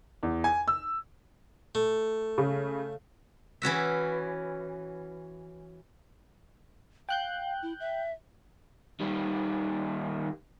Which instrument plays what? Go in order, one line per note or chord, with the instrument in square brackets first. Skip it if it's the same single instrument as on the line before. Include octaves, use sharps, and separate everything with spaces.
[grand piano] E2
G#5
E6
[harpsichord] A3
[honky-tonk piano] C#3
[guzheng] E3 C#4 F#4 E5
[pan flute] F5 [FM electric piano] G5 F#6 G6
[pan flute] E4
E5
[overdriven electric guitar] D#3 G3